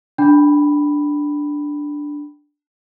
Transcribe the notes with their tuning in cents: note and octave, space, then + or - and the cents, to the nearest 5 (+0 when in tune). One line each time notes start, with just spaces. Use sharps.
D4 +0 G5 +0 B5 +0